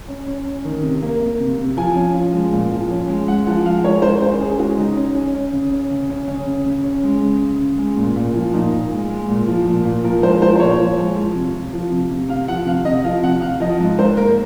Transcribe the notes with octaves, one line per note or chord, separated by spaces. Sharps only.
C#4
C#4
C#4
D#3
C3
A#3
A#3
C3
C3
F3 G#5
C#4
F3
G#3
A#2
F3
C#4
G#3
G#3 F#5
F3 F#5
G#3 F5
G#3 C#5
G#3 C5
C#4 C5
C#4 G#4
G#4
G#3 F#4
C#3 D#4
C#4
C#4
C#4
C#3
C#4
C#3
C#4
C#3 C#4
C#3
C#3
C#4
G#3
C#3
C#3
C#3
G#3
A#2
A#2
F3
A#2 D#4
A#2
G#3
G#3
A#2
F3
A#2
A#2
F3 A#4
G#3 C5
F3 C5
C5
A#2 C#5
F3
G#3
F3
C3
C3
F3
C3
C3
C3 F5
F3 F#5
C3 F5
C3 D#5
F3 F5
C3 F#5
C3 F5
F3 D#5
G#2
G#2 C5
A#3 A#4